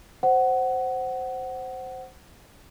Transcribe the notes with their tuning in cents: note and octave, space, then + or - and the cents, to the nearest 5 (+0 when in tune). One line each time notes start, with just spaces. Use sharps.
C5 +0 F#5 +15